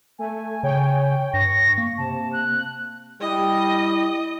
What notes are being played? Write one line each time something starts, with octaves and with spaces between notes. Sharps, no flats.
A3 G#5
C#3 C#5 G5
G2 C#6 A#6
A#3
C3 A5
F#6
G3 E4 D#5 G5